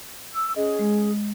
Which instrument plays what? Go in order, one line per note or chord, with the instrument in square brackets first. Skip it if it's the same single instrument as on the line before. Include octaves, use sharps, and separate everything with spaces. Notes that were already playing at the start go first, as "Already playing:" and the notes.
[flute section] E6
[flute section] C#4 G#4 [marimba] D#5
[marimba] G#3